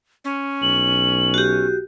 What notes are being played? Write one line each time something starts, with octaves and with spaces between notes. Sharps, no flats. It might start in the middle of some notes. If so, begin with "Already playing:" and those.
C#4
B1 F#7
F#4 G4